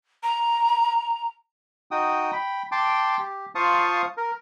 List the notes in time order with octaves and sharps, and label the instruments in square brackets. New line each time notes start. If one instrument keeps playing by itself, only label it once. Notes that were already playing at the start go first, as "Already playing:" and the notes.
[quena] A#5
[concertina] D#4 F#4 G5 D#6
G5 B5
G5 A5 C6 D6
G4
F4 C5 F5 A5 C#6 D#6
A#4